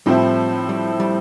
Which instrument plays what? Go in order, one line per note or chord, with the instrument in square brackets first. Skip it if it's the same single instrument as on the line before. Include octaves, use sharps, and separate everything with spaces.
[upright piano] A2 F3 C4 E4 [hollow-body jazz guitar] G3
[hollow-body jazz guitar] G3
G3